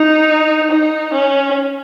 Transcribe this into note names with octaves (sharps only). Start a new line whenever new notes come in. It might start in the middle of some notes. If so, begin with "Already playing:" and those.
Already playing: D#4
D#4
C#4